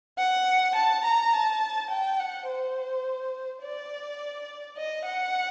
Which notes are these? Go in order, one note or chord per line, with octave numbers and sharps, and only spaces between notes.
F#5
A5
A#5
A5
G5
F#5
C5
D5
D#5
F#5